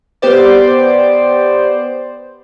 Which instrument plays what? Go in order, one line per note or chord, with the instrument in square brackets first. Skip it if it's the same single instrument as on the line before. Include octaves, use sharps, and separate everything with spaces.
[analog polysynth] B3 G4 C5 D5